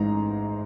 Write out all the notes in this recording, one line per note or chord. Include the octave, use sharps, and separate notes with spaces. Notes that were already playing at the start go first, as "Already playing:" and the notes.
Already playing: A1 G#2 E3 G#3 A#5